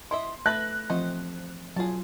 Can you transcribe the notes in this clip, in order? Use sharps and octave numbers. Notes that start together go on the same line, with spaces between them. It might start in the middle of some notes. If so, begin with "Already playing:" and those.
E4 D#5 E5 C6
A3 A4 B4 E5 A5 F#6 A#6
E3 F3 A3 C4 C5 D#5
F#3 F4 G#4 A5